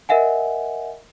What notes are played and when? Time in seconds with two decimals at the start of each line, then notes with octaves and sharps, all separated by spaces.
0.09 A#4 D#5 E5 F#5 G#5